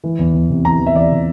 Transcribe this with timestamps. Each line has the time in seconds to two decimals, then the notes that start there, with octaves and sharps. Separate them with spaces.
0.04 E3
0.19 E2
0.34 E2
0.50 C3
0.65 E3 A#5
0.80 E2
0.86 E5
0.95 E2 D5
1.11 C3